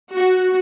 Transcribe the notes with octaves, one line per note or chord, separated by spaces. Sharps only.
F#4